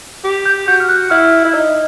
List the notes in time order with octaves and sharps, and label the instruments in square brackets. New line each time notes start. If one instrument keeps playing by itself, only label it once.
[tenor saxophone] G4
[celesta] G6
[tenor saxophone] F#4 [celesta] G6
[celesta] F6
F#6
[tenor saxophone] E4 [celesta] F6
[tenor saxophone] E4
D#4